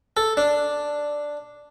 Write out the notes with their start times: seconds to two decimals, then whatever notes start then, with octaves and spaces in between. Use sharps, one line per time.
0.17 A4
0.37 D4